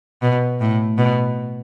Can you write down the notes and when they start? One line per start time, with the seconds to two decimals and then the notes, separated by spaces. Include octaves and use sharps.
0.22 B2
0.60 A2
0.98 B2